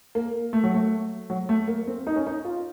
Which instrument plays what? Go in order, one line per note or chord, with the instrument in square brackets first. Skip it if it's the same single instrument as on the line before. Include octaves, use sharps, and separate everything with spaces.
[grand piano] A#3
A3
F#3
A3
F#3
A3
A#3
C4
D#4
C#4
D#4
F4